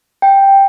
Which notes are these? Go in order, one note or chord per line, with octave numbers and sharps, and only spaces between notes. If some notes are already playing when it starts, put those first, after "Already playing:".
G5